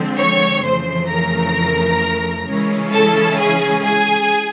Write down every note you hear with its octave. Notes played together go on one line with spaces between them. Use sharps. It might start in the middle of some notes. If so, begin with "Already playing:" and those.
Already playing: D3 F3 G#3 C4
C#5 C#6
F2 C#3 E3 A3 C5 C6
A#4 A#5
C#3 E3 G#3 C#4 E4
A4 A5
G#4 G#5
G#4 G#5